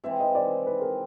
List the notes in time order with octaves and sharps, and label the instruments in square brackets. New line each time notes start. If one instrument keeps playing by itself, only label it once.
[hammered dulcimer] C3 E3 G#3 C4 [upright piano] E5
[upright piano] D#5
D5
B4
A#4